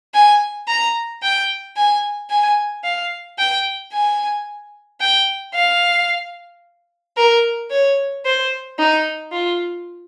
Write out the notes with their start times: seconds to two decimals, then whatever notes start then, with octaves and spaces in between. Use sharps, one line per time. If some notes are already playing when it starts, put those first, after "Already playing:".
0.14 G#5
0.67 A#5
1.23 G5
1.76 G#5
2.30 G#5
2.84 F5
3.38 G5
3.93 G#5
5.00 G5
5.54 F5
7.17 A#4
7.70 C#5
8.25 C5
8.79 D#4
9.32 F4